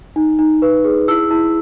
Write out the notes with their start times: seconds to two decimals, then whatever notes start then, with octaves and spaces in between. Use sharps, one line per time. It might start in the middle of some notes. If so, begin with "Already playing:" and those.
0.16 D#4
0.39 D#4
0.62 B4
0.84 G#4
1.08 E4 E6
1.31 E4